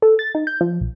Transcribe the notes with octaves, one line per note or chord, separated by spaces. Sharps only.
A4
A6
D#4
G6
F3
B1